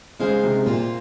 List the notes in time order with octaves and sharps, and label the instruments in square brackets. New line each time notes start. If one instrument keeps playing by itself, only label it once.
[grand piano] C#3 [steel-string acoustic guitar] G#3 D#4 G#4 C5 F5
[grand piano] C3
[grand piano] A#2 [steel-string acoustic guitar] A#3 F4 C5